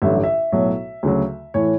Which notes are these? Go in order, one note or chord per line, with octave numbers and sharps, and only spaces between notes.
A1 G2 D3 F#3 E5
E5
B1 A2 F#3
D2 C#3 F#3
A2 E3 C#5